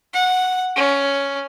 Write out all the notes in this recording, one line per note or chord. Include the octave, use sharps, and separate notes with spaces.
F#5
C#4